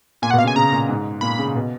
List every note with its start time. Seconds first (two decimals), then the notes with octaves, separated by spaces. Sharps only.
0.22 A#2 G#5
0.31 F#5
0.33 B2
0.39 F5
0.44 C#3
0.48 G#5
0.56 C#3 A#5
0.72 A#2
0.89 G#2
1.21 A#2 B5
1.39 C#3
1.55 B2